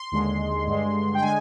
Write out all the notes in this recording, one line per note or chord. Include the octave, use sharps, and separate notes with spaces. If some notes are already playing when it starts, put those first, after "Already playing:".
Already playing: C6
D#2 D3 G#3
G2 D3 G#3
G5
D3 G#3 G#5